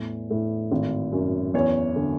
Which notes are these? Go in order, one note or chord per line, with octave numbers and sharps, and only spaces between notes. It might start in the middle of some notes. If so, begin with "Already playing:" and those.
Already playing: E2 A2
A2
G#1
F#2
E2 C#5
D3